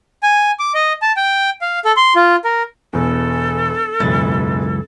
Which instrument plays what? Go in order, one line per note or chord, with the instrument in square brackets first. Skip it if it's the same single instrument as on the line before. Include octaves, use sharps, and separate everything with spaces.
[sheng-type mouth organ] G#5
D6
D#5
A5
G5
F5
A4
C6
F4
A#4
[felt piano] E1 E2 [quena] A4
[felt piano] E1 A6 [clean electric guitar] C#2 F#2 E3